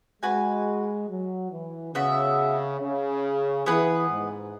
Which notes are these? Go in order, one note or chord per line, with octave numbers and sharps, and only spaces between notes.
G#3 F#4 B4 G#5
F#3
E3
C#3 B3 F#4 E5
C#3
E3 B3 G#4 B4
G#2